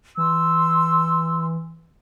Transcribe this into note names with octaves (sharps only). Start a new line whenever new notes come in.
E3 C6 E6